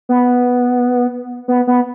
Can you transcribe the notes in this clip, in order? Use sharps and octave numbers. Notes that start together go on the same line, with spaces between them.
B3
B3
B3